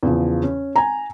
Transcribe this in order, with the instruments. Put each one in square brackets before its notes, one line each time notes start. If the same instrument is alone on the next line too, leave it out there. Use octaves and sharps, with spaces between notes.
[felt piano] E2 C#3 F3
C#4
G#5 A#5